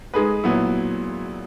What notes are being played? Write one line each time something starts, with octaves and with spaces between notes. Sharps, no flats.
G#3 D#4 G#4 B4
A#2 F#3 B3 E4